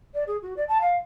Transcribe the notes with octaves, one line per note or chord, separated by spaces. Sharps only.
D5
G#4
F#4
D5
A5
F5